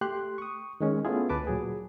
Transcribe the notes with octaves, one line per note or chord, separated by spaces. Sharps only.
A3 G4 C6 F#6
C#6 D#6
D#3 G#3 C#4
A3 B3 C#4 E4 F4 G#4
D2 B4 A5 D6
A#2 F#3 G#4